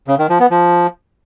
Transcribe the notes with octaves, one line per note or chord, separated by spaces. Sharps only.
C#3
D#3
F3
B3
F3